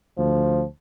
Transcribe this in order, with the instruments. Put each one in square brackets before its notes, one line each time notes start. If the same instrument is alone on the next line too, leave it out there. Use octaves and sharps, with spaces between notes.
[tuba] D2 [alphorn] F3